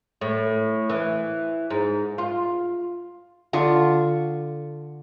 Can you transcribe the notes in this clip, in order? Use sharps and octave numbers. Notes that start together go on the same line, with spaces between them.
A2
E3
G#2
F4
D3 F4 C#6